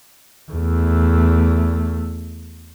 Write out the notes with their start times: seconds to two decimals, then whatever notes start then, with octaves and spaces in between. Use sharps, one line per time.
0.51 E2 A3